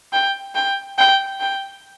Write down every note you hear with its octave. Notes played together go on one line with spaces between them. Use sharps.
G5
G5
G5
G5